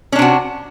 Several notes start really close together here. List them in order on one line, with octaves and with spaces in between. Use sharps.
C#4 D4 C3 F#4